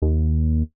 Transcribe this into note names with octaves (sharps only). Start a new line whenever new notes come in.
D#2